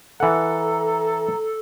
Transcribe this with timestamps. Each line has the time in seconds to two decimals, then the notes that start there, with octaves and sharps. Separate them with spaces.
0.20 E3 A4 F#5 A#5